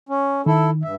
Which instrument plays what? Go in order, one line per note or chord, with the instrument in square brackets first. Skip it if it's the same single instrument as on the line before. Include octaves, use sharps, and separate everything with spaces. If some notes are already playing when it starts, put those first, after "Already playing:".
[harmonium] C#4
[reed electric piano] D#3 [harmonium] E4 A4
[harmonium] G2 E5